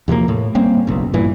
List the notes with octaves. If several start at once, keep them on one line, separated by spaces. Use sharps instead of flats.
E2 C3 F3 A#3
A2
G3 A#3 C4 C#4
F#1 B1
G2 A#2 E3